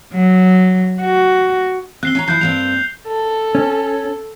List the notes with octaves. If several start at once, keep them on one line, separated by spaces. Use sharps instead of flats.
F#3
F#4
C4 F#6 C7 G7
C#4 C#5 A#5
F3 E4 F#6 G6 C7
G2 A#3 C4 F7
A4
C#4